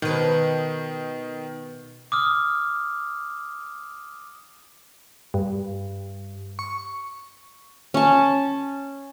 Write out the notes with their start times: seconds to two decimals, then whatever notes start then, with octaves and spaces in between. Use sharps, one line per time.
0.02 B2 D#3 B4
2.12 D6 D#6 F6
5.34 G2
6.59 C#6
7.94 C#4 A5